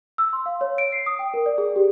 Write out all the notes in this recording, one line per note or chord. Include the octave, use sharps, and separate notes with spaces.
E6
C6
F5
C#5
D7
C7
D#6
G5
A#4
D5
G#4
G4